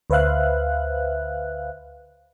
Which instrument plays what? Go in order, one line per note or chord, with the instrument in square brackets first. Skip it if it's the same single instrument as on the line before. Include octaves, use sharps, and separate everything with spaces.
[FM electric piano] D2 B4 C5 E5 F5 F#6